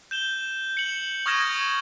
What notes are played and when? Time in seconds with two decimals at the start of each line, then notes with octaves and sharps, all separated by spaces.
0.11 G6 E7 G7
0.77 C#7 F#7
1.26 C#6 D#6 F6 G#6 A#6 E7